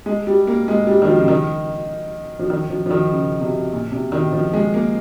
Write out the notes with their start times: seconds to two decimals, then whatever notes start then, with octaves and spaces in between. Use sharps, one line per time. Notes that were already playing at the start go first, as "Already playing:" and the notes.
0.06 G#3
0.27 G3
0.47 A#3
0.68 G#3
0.87 G3
1.02 D#3
1.08 F3
1.19 C#3
1.28 D#3
2.39 F3
2.50 D#3
2.70 F3
2.86 F3
2.91 D#3
3.11 C#3
3.41 C3
3.72 A#2
3.92 C3
4.12 D#3
4.32 F3
4.54 G#3
4.74 A#3